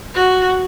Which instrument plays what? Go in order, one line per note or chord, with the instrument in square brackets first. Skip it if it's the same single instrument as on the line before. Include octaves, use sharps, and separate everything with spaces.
[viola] F#4